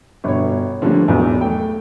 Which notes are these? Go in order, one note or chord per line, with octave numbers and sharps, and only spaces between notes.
G1 B2 C#5
D3 F3 G3 A3 A#3 C#4
E1 B1 E2
A3 G5